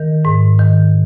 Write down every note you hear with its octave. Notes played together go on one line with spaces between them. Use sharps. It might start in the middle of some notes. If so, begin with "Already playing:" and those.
Already playing: D#3 A#4
G#2
D#3